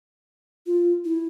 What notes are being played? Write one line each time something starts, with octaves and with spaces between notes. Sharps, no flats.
F4
E4